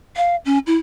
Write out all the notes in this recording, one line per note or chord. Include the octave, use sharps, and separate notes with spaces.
F5
C#4
E4